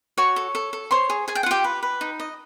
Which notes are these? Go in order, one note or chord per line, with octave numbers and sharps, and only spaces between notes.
F#4 C#5 C#6
A4
A4
A4
C5 C#5 C6
G#4
G#4 G#5
G5
F#5
F4 G4 G5
B4
B4
D#4
D#5